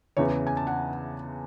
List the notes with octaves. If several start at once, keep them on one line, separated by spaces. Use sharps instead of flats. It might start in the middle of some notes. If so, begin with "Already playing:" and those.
E2 C#3 E3 C#5
G#5
A5
F#5